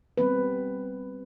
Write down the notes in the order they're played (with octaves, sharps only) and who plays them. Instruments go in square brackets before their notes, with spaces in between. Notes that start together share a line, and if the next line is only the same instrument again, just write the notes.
[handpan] G3 B3 C4 B4